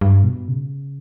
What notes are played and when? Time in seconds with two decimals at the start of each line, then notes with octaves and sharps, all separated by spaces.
0.01 G2
0.24 B2
0.48 C#3